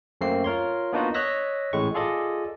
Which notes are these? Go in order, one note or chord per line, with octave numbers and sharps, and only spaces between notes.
F#2 A3 A#3 C4 C7
F4 A#4 C#5 C6
A#3 B3 D4 D#4 F4 F#4
C#5 D#5 E6 F#6 A#6 B6
A1 A2 G#3 C#6
F4 G#4 A4 D5 D#5